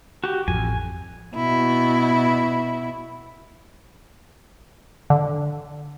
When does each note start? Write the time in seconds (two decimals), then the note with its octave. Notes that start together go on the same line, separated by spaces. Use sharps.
0.24 F#4 G4
0.48 A1 F2 G#5
1.36 B2 E4
5.10 D3